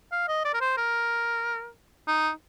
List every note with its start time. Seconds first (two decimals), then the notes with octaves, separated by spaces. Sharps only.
0.12 F5
0.28 D#5
0.45 D5
0.54 A#4
0.61 C5
0.77 A#4
2.07 D#4